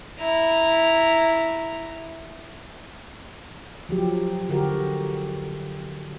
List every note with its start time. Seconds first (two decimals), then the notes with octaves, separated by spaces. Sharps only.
0.20 E4 A#5
3.89 F3 F#3 G4
4.49 D3 F#4 G4 A#4